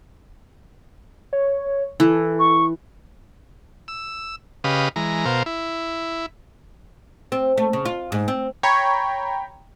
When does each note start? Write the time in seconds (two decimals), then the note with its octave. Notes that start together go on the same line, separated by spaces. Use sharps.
1.33 C#5
2.00 E3 A4
2.39 C#6
3.88 E6
4.64 C#3 G4 B4 D#5 F5
4.96 E3 G#3 A#5
5.25 B2 A#4 C5 F5
5.46 E4
7.32 C4
7.58 A3
7.73 C#3
7.85 F4
8.12 G#2
8.28 C4
8.63 C#5 G5 A#5 B5